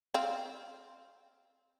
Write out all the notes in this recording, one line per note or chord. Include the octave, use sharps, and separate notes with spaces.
C4 F5